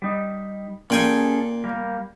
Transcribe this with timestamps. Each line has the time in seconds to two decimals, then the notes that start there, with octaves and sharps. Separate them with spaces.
0.02 G3 D#4
0.90 A#2 C#4 G#4 A4 G5 G#5
1.64 G3 A#3